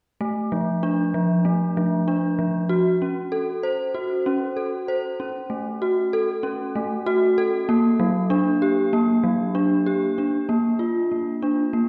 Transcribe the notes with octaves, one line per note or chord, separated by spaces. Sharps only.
A3
F3
D4
F3
A3
F3
D4
F3
F#4
C#4
A4
C5
F#4
C#4
A4
C5
C#4
A3
F#4
A4
C#4
A3
F#4
A4
A#3
F#3
D4
G4
A#3
F#3
D4
G4
D4
A#3
F4
A#3
D4
A#3